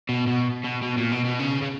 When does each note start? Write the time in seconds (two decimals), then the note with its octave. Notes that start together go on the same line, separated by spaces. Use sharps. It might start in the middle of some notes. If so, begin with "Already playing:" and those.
0.09 B2
0.27 B2
0.64 B2
0.83 B2
0.98 A#2
1.12 B2
1.25 B2
1.39 C#3
1.62 C#3